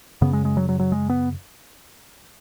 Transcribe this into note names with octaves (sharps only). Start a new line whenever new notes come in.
F#2 C#3 B3
G#3
G#3
F#3
F#3
F#3
G#3
B3